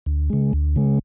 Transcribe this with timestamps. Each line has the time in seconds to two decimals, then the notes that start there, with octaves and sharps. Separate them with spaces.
0.06 D2
0.30 C#3 G#3
0.53 D2
0.76 C#3 G#3